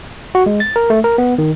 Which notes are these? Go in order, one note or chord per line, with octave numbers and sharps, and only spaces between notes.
F#4
G#3
A6
A#4
A3
A#4
B3
D#3